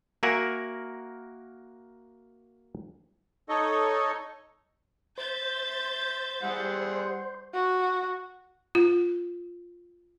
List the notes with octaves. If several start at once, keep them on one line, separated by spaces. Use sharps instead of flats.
A#3 F#4 A#4 E5 F#5 G#5
D#4 A4 C#5 D#5
C5 E5 G6 A6
G3 E4 G#4 F#5
F#4
F4